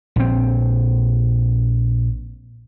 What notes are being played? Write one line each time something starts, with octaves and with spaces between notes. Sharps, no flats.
A#1 C4